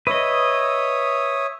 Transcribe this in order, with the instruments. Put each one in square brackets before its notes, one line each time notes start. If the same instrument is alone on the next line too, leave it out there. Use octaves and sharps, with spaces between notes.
[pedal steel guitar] B4 D#5 [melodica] C#5 E5 D#6